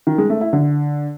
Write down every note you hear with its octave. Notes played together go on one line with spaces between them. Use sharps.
D#3
G#3
A3
E4
D3